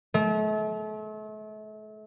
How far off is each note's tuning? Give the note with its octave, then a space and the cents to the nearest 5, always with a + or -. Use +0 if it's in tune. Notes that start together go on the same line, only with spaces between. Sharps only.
A3 -40